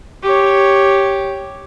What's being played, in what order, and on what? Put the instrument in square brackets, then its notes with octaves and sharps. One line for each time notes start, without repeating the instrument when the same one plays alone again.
[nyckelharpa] G4 C#5